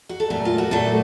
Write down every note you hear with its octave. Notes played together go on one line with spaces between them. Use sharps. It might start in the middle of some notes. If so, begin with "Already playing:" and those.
F#4
A4
A#2 F#3 A3 A#4
F4
F#4
A#2 F#3 A3 A4